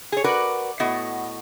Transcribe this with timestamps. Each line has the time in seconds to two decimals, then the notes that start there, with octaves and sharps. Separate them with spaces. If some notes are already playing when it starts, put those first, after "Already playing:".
0.12 G#4 C#5
0.24 F#4 A#4 B4 D5
0.80 A2 B3 F#4 D#5